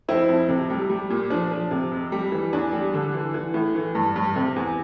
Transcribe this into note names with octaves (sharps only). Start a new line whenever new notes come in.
F2 C4 E4
F2
C3
G3
G3
A#2
F3 D4
F3
C3
F2
G3
E3
E2 D4
G3
D3
E3
E3
A2
E3
G2
G2
C3
E2